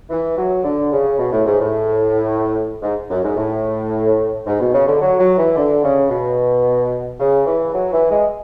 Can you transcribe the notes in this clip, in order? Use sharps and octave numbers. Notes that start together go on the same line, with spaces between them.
E3
F#3
D3
C#3
B2
A2
G#2
A2
G#2
F#2
G#2
A2
G#2
B2
C#3
D3
F#3
F#3
E3
D3
C#3
B2
C#3
E3
F#3
E3
G#3